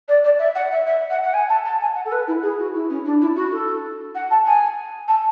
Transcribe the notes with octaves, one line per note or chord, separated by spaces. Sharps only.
D5
D5
E5
F#5
E5
E5
F#5
F#5
G#5
A5
A5
G#5
F#5
A4
B4
E4
G#4
F#4
E4
C#4
D4
E4
F#4
A4
F#5
A5
G#5
A5